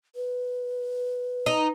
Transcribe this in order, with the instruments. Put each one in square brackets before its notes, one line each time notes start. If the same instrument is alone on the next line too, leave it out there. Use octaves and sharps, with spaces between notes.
[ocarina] B4
[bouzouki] D#4